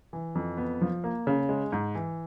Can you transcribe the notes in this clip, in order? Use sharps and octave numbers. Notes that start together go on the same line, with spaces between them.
E3
F2
B3
F3
A#3
C#3
G#3
G#2
E3